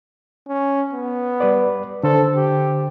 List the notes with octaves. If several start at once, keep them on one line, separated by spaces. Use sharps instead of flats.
C#4
B3
G3 B4 D5
D3 A4 C5
G4